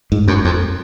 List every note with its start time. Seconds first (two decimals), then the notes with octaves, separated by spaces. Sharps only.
0.12 G#2
0.28 F#2
0.45 F2